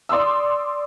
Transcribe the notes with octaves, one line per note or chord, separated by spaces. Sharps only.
D5 C6 D#6 E6